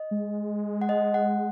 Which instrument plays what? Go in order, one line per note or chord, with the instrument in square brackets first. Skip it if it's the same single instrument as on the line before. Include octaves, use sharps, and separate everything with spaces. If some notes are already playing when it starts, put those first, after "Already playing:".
Already playing: [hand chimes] D#5
[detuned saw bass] G#3
[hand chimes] F#5
D#5
F#5